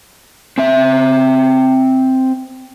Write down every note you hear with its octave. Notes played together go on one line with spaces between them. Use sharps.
C4 E5